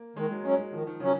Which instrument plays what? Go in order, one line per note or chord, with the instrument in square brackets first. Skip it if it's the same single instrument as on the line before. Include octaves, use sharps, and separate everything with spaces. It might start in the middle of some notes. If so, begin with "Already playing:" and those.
Already playing: [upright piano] A#3
[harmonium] D#3 [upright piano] G#3
[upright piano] F#3
[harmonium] F#3 C#4 [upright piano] G#3
[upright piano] F#3
[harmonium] D#3 [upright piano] F3
[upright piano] D#3
[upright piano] C#3 [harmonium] F#3 C#4